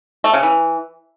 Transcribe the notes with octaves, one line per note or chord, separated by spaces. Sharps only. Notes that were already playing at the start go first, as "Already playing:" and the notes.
A3
C#3
E3